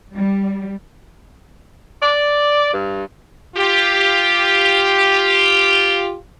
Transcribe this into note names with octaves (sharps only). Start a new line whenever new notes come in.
G3
D5
G2
F4 G4